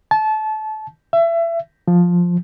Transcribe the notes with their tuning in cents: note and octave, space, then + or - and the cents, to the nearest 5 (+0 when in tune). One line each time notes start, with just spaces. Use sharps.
A5 -25
E5 +30
F3 +5